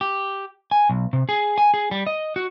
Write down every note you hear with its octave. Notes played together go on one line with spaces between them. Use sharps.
G4
G#5
B1
C3
G#4
G#5
G#4
G3
D#5
F#4